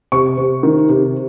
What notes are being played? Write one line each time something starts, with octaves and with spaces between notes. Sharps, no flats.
C3 C#6
C3
D#3
C3